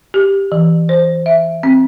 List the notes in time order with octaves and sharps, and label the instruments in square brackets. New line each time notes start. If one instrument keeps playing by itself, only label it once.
[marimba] G4
E3
C5
E5
C4